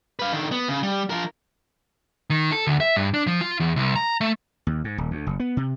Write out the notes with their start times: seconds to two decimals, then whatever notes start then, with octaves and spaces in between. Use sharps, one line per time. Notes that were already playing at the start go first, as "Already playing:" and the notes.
0.19 B4 F5
0.32 D3 D#3
0.51 B3
0.69 C#3
0.83 G3
1.10 F3 A#4
2.30 D#3
2.52 A4
2.67 D2
2.80 E5
2.97 G2
3.14 D4
3.27 F3
3.41 F4
3.60 E2
3.76 C2
3.96 A#5
4.21 A3
4.67 D#2
4.84 G#2
4.98 D#1
5.11 D2
5.27 F#1
5.40 B3
5.57 C3